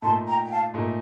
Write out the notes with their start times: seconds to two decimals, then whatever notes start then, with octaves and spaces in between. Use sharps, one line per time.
0.02 A#2 A3 D#4 A5 C6
0.27 G5 A#5
0.44 G5
0.50 F5 A5
0.74 A#2 A3 D#4